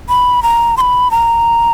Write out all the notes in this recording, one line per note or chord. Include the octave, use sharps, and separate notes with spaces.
B5
A#5
C6
B5
A#5